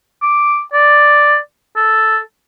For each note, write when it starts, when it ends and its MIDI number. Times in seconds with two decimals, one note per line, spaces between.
0.22 0.61 86
0.73 1.38 74
1.77 2.19 69